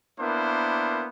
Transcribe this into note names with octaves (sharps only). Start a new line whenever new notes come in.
A#3 B3 D4 E4 A#4 C5